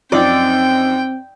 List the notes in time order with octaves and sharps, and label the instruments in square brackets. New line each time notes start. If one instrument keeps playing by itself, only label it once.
[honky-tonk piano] F#2 F3 D#4 [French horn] C4 [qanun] D5 [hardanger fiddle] G5